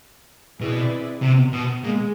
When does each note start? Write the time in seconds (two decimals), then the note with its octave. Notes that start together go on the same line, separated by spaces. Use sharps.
0.60 B2 C4 E4 G#4 B4 D5
1.22 C3
1.53 B2
1.84 A#2 G#3